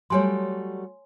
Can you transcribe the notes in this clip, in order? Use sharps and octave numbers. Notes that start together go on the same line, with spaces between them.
F#3 G3 A3 C#5 G#5 C6